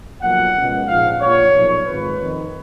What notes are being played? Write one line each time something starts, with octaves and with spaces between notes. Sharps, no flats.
B1 A#2 F3 F#5
C#2 B2
A#1 G#2 F3 F5
A#1 A#2 F3 C#5
B1 A#2 F3
G#1 G#2 F3 B4
F2 D#3